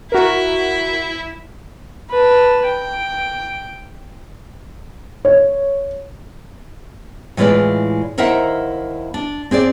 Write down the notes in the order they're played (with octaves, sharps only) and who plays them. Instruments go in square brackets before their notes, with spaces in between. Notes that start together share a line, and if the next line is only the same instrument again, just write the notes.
[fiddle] E4 E5 [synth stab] F#4 A#4
[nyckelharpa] B4 A5
G5
[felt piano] C#5
[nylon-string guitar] A2 E3 G#3 F4 B4 D5
D#2 E4 A#4 C5 E5 F#5
D4
C4 G#4 C5 D5